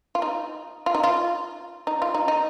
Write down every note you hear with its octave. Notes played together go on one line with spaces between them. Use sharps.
F4
D#4
F4
D#4
F4
D#4
F4
D#4
D#4